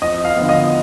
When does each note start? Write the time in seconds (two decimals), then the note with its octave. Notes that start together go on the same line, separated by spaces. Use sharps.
0.02 F2 D#5
0.25 F5
0.37 D3 F3 B3
0.49 D#5